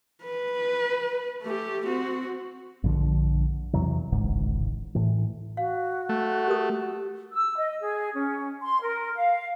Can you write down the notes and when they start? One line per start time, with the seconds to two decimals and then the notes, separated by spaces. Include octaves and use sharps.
0.23 B4
1.43 A3 G4
1.86 C4 F#4
2.83 A#1 G2 D3 F3
3.73 E2 C3 E3 F#3
4.12 D1 G#1 C#2 G#2
4.95 A2 E3
5.57 F#4 F5
6.09 A3
6.48 G4 A#4 D#6
7.32 E6
7.57 D#5
7.81 G#4
8.14 C#4
8.62 C6
8.81 A#4
9.16 F5